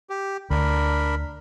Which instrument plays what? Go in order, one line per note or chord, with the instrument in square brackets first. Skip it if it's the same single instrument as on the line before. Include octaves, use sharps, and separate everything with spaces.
[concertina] G4
[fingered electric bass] D2 [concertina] D4 A#4 B5